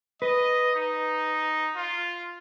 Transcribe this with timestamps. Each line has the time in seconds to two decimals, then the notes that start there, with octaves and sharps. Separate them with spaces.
0.22 B4 D#5
0.75 D#4
1.76 F4